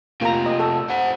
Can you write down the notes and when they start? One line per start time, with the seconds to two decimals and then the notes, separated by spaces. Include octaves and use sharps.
0.21 C3 A#3 F4 A#5
0.46 D#5
0.60 A4
0.90 C5 F#5